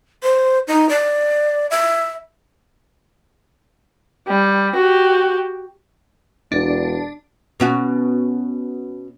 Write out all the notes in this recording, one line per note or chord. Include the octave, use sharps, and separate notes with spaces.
C5
D#4
D5
E5
G3
F#4 G4
E1 D4
B2 C#4 F#4